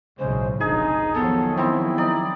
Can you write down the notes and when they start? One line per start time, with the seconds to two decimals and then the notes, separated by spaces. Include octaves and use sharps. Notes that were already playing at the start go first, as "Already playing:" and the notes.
0.19 B1 A2 C#3 G#3 C5
0.60 F1 B1 D4 D#4 G#4
1.15 D#3 F3 F#3 B3 A4
1.57 B3 C4 E4
1.98 D#4 D5